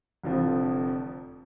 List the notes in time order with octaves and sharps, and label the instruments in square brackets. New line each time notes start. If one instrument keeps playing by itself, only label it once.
[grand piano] F1 F2 D3 F3